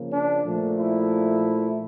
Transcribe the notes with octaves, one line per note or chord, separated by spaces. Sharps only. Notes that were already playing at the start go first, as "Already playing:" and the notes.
Already playing: C#3 F3 A#3
D4
A#2 F3 A3
E4